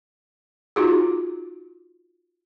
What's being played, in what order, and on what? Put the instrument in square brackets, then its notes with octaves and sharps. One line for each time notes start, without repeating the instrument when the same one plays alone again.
[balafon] D#4 F4 F#4 G#4